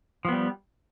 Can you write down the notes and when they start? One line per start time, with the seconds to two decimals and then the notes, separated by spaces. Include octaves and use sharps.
0.25 F3
0.28 B3
0.32 G3